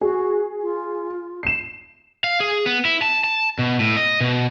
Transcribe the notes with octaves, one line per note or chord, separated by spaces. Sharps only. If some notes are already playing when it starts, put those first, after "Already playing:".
F#4 G#4
F4
C7 E7
F5
G#4
B3
E4
A5
A5
B2
A2
D#5
B2